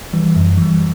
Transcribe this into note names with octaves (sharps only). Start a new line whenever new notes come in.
E3 G3
F#2
E3 G3